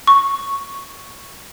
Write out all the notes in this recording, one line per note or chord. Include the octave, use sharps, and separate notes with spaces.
C#6